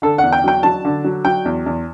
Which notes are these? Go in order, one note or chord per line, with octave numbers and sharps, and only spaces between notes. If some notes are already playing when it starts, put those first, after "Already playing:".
D3 A4
E2 F#5
G5
F#3 G5
F#3 A5
D3
F#3
F#3 G5
E2
E2